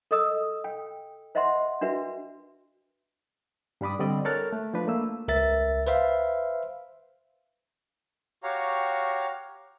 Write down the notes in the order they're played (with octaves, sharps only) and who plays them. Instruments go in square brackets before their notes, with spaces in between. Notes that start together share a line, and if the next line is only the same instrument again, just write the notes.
[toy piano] A4 D#5 D#6 E6
G5
C5 D#5 E5 F#5 C6
D4 F#4 B4 E5
[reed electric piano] G2 G3 D4 B5 D6 D#6
D3 G3 C4 D5 D#5
A4 A#4 C#5 F6 F#6 A6
A3
F3 D4 B4
A3 A#3 E6
[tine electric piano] C#2 A#4 E5 A6
B4 C5 E5 F5
[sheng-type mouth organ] F#4 G4 C#5 F5 A#5